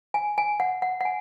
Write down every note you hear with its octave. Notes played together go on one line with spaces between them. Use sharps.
G#5
G#5
F#5
F#5
F#5
G#5